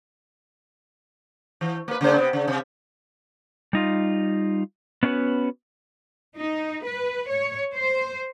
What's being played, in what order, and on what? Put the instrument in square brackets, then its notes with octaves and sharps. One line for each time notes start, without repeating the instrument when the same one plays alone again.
[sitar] E3
A#3 B4
C#3 A#3 C5
C3 B3
C#3
C3
[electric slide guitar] G3 D#4 F4
B3 C#4 D4 F#4 B4
[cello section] D#4
B4
C#5
C5